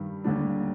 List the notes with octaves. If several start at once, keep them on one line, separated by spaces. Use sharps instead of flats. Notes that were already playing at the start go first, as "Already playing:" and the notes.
Already playing: G2 D#3 G3
D#2 D3 G3 D4